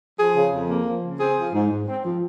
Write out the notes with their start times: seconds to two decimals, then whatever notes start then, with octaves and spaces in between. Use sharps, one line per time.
0.19 F3 G#4
0.36 C#3
0.53 F2
0.70 A#3
0.86 F3
1.03 C#3
1.20 C4 G#4
1.37 F3
1.54 G#2
1.71 G#2
1.88 C4
2.05 F3